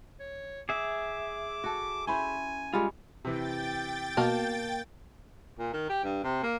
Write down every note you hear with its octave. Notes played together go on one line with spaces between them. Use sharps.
C#5
G#4 E5 D6
F#4 A4
C#4 E4 C5 G#5
G3 G#3 F4 C#5
C3 E3 G5 A6
B2 A#3 A5
A#2
D#3
G4
G2
C3
A#3